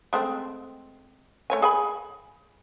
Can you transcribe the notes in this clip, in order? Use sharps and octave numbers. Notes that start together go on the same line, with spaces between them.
G#3 A3 C4
A3 C#5 G#5
G#4 G#5 B5